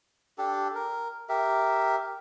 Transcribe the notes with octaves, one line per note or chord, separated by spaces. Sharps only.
D4 G4 A4
A#4
G4 A#4 E5